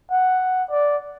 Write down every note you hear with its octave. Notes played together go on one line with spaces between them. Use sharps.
F#5
D5